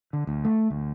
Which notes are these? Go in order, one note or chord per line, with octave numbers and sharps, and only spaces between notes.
D3
D2
A3
D2